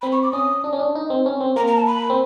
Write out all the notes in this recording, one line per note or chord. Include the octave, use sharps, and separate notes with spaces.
C4 B5
C#6
D6
C#4 D#6
D4
C#4
D4
D#4
C4
C#4
C4
A#3 A#5
A#5
A5
B5
C4